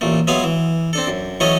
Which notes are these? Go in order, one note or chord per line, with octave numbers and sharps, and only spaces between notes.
A1 A#2 A3
F#3 G#3 B3 B4 E5 F5
E3
C4 D4 A4
F#2
E3 F#3 A3 C#4 A4 D#5